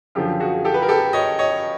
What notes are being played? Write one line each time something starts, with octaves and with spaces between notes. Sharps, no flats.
F#2 D3 F3 F4 G4
F#4 G#4
G#4
G4 A4
B4
A#4
G4 A4
C#5 D#5
C#5 D#5